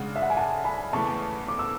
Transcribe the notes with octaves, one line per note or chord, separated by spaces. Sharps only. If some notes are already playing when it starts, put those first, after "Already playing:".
Already playing: C#3 G#3 D4 F#5
E5
F#5
G#5
F#5 A5
G#5 B5
E2 C#3 E3 A3 A5 C#6
D6
E6